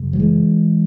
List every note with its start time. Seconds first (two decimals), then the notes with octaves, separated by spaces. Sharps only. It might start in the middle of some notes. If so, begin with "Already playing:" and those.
Already playing: F#2 C#3
0.13 F#3
0.19 E3 G#3